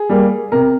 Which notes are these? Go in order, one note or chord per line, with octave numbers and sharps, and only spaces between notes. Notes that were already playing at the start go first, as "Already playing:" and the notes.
Already playing: G#4
G3 A#3
C3 A#4